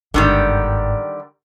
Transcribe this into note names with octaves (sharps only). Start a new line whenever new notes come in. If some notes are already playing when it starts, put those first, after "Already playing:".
G1 G#2 D3 D#3 G3